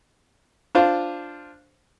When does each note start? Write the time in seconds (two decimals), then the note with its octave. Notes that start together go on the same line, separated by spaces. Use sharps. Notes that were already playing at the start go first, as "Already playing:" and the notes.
0.75 D4 F4 C5